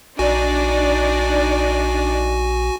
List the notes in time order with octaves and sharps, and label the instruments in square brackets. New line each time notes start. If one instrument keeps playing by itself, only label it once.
[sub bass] A#1 [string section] D4 D#4 D5 [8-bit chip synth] F#4 G#5